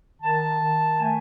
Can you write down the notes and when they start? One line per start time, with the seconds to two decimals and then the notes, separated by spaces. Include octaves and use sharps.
0.22 D#3 A5
0.61 D#3
0.99 A3 G#5